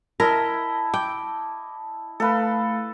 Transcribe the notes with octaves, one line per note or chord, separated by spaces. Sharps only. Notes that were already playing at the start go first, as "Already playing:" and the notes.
E4 A#4 D#5 E5 A5 B6
G5 D6
A3 A4 B4 F5 B5